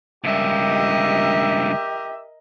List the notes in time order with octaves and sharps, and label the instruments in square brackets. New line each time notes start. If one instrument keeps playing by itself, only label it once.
[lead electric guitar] C#2 G2 [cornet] G4 [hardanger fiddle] A#4 D#5 [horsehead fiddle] E5